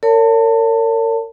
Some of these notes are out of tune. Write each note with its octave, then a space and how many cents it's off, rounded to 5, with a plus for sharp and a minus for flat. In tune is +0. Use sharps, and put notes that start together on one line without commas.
A#4 -40 C#5 +25 A5 +25